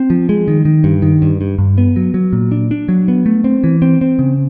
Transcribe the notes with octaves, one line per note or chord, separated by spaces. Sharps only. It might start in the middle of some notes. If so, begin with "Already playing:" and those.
Already playing: C4
F3
G#3
D#3
D#3
G2
D#3
G2
G2
G2
B3
F#3
F#3
A#2
D4
D4
F#3
B3
A3
C4
E3
C4
C4
C#3